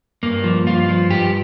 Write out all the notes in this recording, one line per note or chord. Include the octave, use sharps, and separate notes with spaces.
G2 A#3
F3
G2 F4
F3
G2 G4